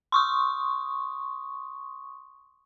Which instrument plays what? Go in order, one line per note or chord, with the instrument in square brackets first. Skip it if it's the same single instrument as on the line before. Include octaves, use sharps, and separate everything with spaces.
[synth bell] C6 C#6 D#6